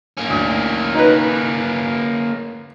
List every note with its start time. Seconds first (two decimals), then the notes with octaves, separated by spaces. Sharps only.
0.17 A#3 C#4
0.30 D2
0.95 D#4 B4